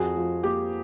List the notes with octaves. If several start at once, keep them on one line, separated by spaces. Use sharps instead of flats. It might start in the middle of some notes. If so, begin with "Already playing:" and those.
Already playing: F2 F#4 G#4
F3
A#3 G4